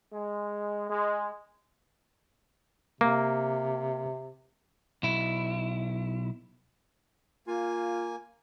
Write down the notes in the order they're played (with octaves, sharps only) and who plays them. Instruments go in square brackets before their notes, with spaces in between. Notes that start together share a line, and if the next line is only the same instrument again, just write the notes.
[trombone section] G#3
G#3
[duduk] C3 [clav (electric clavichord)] A#3
[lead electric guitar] B1 E4
[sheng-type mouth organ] A#3 G#5 [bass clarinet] F4